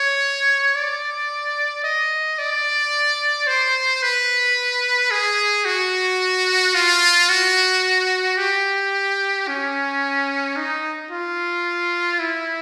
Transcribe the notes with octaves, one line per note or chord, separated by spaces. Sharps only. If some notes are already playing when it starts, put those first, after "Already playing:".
Already playing: C#5
D5
D#5
D5
C5
B4
G#4
F#4
F4
F#4
G4
C#4
D#4
F4
E4